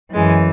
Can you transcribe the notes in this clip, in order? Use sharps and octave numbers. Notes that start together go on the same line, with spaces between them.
F#2 E3 G#3